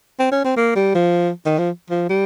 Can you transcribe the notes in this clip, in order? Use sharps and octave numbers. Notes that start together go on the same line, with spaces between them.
C4
C#4
C4
A#3
G3
F3
D#3
F3
F3
G3